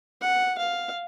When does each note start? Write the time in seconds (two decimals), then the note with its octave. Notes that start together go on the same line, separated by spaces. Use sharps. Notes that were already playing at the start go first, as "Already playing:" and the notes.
0.22 F#5
0.58 F5